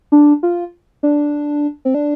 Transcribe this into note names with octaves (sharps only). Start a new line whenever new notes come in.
D4
F4
D4
C4
D4